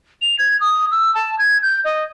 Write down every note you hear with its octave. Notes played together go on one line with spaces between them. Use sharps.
F7
G#6
D#6
E6
A5
G#6
G6
D#5